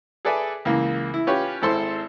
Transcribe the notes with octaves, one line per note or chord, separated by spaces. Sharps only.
G#4 A4 B4 D5 E5 G#5
C#2 E3 A#3
E4
C#4 F4 G4 B4 C#5
G#1 E4 A4 C5 C6